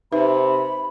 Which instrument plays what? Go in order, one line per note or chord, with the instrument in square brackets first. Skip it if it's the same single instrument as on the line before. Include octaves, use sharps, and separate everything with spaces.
[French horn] C3 [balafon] D#4 B4 E5 [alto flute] B5